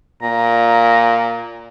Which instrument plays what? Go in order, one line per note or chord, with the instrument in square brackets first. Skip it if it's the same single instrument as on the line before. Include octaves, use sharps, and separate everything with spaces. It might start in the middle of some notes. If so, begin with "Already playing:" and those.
[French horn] A#2 [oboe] A#5